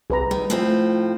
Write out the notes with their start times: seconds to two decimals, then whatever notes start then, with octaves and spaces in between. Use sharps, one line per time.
0.10 C2 G#4 B4 A#5
0.31 D#3 G3
0.50 A2 F3 A3 C4